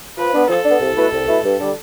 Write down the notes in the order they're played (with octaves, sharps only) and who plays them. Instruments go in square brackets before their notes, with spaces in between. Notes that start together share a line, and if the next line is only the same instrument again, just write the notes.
[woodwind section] F3 [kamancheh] B4
[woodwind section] B3 D4
[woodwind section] F3 [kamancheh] A4
[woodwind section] B3 D4
C2
B2 A3 E4 B4
C2
B2 A3 E4 B4
G2
D3 G3 D4